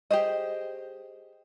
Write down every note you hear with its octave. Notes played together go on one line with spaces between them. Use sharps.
G4 G#4 C5 D#5